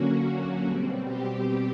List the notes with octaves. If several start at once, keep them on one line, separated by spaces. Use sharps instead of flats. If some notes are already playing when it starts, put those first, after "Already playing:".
Already playing: D3 F#3 A#3 C#4 F#4
B2 G3 C4
G4